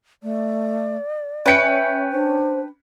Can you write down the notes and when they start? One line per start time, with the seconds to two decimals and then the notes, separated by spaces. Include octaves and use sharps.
0.23 A3 D5
1.46 C#4 B4 E5 G5 C#7
2.12 D4 C5